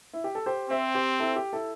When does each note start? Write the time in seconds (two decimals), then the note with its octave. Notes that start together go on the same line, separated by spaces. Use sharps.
0.13 E4
0.24 G4
0.35 A4
0.46 G4 C5
0.70 C4 C5 E5
0.95 G4 C5
1.20 E4 A4
1.36 G4
1.53 E4 A4